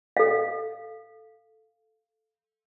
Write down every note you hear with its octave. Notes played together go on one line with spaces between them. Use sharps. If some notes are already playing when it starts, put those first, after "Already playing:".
A4 F5